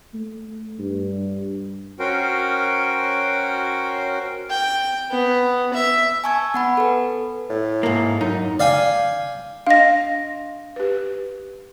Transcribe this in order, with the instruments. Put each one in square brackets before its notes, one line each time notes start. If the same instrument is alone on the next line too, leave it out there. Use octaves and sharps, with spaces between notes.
[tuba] A3
G2
[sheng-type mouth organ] C#4 F#4 A#4 C5 G5
[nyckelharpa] G5
B3
E5
[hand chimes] G#5 A5 C#6 E6 G#6
B3 F#5 B5
A4 B4
[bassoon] A2
[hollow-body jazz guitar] G#2 A#3
F#2 D#4
[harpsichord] D5 F5 G5 G#5
[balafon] D4 D#5 [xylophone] F5 A#6
[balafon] G4 B4